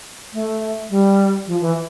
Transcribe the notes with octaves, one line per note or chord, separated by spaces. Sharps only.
A3
G3
F3
E3